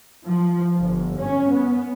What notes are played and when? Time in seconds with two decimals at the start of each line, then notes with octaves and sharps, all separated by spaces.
0.24 F3
0.78 G1
1.17 C#4
1.52 B3